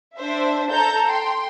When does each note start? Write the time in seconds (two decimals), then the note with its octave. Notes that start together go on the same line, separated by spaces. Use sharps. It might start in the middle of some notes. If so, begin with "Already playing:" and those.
0.17 D4 C5 E5
0.71 A4 A#5 G6
1.08 G5 C6